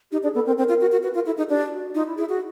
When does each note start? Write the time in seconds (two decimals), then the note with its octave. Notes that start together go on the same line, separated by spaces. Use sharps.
0.11 D#4 G4
0.23 D4 G#4
0.34 B3 A4
0.46 C4 A#4
0.57 C4 A#4
0.69 F4
0.81 F#4
0.92 F#4
1.03 F#4 B4
1.14 F4 A#4
1.26 E4 A4
1.37 D#4 G#4
1.49 D4 G4
1.65 G4
1.71 F#4
1.95 D#4 F4
2.06 E4
2.17 E4 G#4
2.28 F#4 G#4